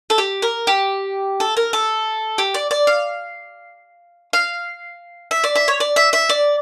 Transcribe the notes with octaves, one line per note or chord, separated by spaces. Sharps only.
A4
G4
A#4
G4
A4
A#4
A4
G4
D5
D5
F5
F5
E5
D5
E5
C#5
D5
E5
E5
D5